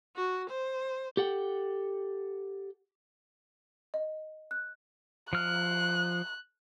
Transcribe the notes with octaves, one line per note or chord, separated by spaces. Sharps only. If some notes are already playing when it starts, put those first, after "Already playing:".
F#4
C5
G4 A4 F#5 G5
D#5
F#6
F3 F6 F#6